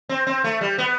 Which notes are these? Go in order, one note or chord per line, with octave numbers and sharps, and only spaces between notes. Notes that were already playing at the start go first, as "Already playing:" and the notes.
C4
C4
A3
G3
B3